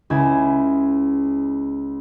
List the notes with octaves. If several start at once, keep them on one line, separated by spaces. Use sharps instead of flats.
C#2 C#3 E4 G#6